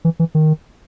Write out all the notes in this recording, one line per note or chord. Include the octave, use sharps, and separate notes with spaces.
E3
E3
D#3